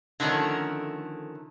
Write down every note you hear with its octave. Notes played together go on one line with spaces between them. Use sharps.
D3 D#3 F3 A3 C#4